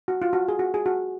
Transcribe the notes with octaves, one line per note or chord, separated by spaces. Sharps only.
F#4
F4
F#4
G#4
F#4
G#4
F#4